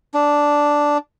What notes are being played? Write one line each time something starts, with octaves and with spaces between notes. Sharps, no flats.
D4